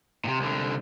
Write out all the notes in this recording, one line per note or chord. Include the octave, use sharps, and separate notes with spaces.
A2 C3
C2 D3